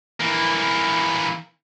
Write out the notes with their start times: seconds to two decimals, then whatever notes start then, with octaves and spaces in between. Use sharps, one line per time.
0.20 E3 A#3